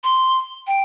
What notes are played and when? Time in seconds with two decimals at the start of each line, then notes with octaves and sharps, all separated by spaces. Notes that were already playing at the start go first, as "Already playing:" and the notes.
0.04 C6
0.67 G5